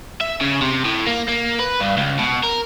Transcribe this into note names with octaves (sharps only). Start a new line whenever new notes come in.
E5
C#3
C3
A2
A#3
A#3
B4
G2
C#2
B2
A#4